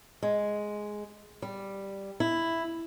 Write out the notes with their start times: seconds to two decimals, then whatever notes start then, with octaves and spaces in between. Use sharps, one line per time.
0.23 G#3
1.42 G3
2.20 E4